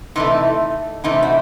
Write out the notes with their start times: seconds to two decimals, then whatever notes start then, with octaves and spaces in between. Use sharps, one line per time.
0.16 C3 E3 A3 D#4
1.04 C3 E3 A3 D#4
1.23 F#4